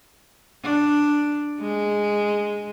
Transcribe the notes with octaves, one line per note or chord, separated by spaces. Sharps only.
D4
G#3